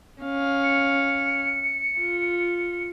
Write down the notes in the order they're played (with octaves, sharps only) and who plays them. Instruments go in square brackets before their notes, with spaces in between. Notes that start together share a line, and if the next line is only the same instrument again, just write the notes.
[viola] C#4 F5
[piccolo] C#7
[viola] F4